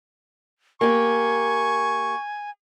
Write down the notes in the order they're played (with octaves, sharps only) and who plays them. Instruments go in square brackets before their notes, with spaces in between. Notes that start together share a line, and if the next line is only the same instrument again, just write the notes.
[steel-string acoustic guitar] A#3 G4 [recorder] G#5 [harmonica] C#6